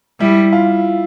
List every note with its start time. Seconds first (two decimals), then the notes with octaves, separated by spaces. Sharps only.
0.20 G3 E4
0.53 F4